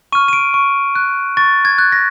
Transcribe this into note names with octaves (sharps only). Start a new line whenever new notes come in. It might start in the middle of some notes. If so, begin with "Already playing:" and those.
C#6 F6 D#7
D#7
D7
C#6
F#6
C#6 A6
G#6
F#6
A#6